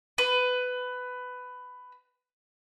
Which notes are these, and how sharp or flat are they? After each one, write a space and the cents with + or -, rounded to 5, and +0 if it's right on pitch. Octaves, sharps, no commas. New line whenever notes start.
B4 +15